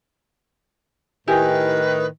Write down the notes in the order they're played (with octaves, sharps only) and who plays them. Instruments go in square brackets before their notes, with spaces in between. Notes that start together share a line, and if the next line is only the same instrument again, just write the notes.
[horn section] A2 D#3 [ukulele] E4 G4 G#5 [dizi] B4